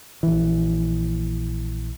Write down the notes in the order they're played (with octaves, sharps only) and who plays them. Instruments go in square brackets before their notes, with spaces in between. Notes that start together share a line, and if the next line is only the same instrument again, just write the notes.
[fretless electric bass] A#1 E3